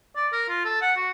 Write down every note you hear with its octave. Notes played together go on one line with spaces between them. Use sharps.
D5
A#4
F4
A4
F#5
F#4